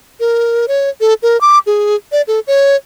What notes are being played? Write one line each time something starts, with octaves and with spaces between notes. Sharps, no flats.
A#4
C#5
A4
A#4
D6
G#4
D5
A4
C#5